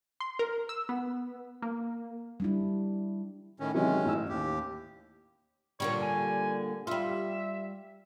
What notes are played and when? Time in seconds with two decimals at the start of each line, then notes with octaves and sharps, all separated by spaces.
0.20 C6
0.39 A#4
0.69 E6
0.89 B3
1.62 A#3
2.40 G3 D4 E4
3.60 A2 D#3 C#4
3.74 C3 D#3 E3 F#3 G#3 C#4
4.05 A1 E6
4.29 D#2 G4
5.80 A#2 D3 G3 C#5
6.01 G#5
6.87 G3 F4 E5